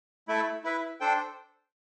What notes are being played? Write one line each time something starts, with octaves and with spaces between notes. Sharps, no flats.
A3 E4 A4 E5
E4 B4 E5
D4 A4 C5 G5